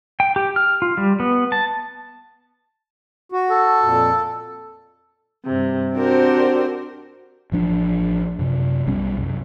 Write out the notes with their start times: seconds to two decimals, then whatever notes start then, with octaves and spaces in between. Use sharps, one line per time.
0.20 G5
0.36 G4
0.56 F6
0.82 F4
0.97 G3
1.20 B3
1.52 A5
3.32 F#4
3.50 A4
3.83 F2 A#2
5.45 G2 C3
5.93 C4 D4 F#4 G4 A#4 C5
7.52 A1 F3 D4
8.39 F#2 C3
8.87 B1 B2 G3 C#4
9.18 C2 F#2